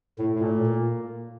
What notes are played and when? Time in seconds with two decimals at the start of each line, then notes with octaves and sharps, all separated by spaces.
0.19 A2 A3
0.35 A2
0.42 A#2
0.66 A#3